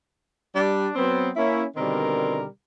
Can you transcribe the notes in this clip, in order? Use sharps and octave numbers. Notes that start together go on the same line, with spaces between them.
G3 D4
F#3 B3 C4
A#3 C#4 E4
B2 D3 D#3 G3 C4 A#4